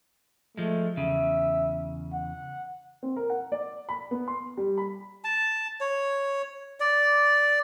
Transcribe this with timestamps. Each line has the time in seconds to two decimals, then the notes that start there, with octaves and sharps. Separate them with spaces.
0.57 F3 G#3 A3
0.97 E2 C#3 E5
2.13 F#5
3.03 C4
3.16 A#4
3.30 F#5
3.52 D5
3.89 B5
4.11 B3
4.28 C6
4.57 G3
4.78 B5
5.24 A5
5.81 C#5
6.80 D5